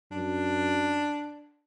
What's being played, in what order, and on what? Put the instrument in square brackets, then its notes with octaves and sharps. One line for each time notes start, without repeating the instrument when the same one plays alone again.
[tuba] F#2 [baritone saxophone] D4